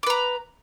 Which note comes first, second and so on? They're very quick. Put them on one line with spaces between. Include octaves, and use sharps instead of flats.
D6 B4 A#5